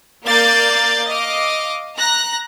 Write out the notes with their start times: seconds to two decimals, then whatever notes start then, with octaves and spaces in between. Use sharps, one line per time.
0.25 A#3 D5 F5 G6 A6
1.07 D#5 F5 D6
1.95 A#5 F#6 A#6